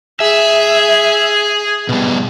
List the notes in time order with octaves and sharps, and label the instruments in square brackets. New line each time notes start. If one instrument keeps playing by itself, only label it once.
[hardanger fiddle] G#4 [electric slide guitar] E5
[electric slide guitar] B2 G3